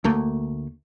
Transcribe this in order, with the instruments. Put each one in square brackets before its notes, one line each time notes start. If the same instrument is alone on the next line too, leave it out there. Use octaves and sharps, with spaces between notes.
[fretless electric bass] D2 A3 A#3